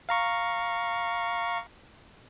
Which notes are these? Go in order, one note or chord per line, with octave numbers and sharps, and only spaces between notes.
F5 A#5 C#6